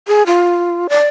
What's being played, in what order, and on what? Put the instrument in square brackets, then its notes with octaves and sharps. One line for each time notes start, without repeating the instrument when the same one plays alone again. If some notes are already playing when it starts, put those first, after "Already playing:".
[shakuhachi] G#4
F4
D5